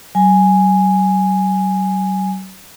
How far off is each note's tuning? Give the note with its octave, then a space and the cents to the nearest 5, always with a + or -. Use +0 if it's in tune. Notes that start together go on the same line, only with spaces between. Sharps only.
F#3 +45 G#5 +0